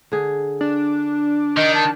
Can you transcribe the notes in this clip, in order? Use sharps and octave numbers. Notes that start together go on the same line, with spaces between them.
D3 G#4
D4
D#3 D#5
A5